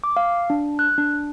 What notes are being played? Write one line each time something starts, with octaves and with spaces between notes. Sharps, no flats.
D6
F5
D4
F#6
D4